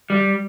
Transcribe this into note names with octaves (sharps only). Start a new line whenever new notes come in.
G3